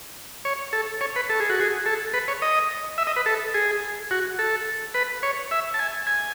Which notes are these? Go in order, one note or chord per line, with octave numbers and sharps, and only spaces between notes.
C#5
A4
C#5
B4
A4
G#4
F#4
G#4
A4
B4
C#5
D#5
E5
D#5
B4
A4
G#4
F#4
A4
B4
C#5
E5
A5
G#5
G#5